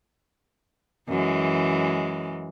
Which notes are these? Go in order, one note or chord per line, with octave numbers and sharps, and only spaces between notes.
F#2 E3 G#3